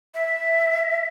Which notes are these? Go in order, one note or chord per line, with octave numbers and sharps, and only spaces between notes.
E5